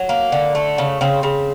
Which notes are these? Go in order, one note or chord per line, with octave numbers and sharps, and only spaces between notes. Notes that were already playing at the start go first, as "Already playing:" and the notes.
Already playing: F#3
A#3
D3
A3
C#3
C#3 C4
C#3